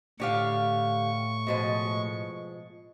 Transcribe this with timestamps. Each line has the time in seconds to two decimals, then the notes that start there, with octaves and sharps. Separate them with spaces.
0.20 A2 D3 G4 F5 C#6
1.47 B2 F3 G#3